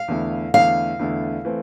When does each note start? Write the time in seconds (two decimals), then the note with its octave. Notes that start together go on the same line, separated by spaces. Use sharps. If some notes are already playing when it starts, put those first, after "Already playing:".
Already playing: F5
0.08 E2 D3 A3 E4
0.54 E2 D3 A3 E4 F5
0.99 E2 D3 A3 E4
1.45 E3 A3 C4